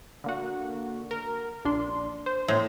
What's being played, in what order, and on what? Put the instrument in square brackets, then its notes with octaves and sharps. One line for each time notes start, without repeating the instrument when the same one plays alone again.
[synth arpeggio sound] D3 A#3 F#4
A#4
A#1 D4 C6
C5
[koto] A2 [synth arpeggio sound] A#3 C5 E5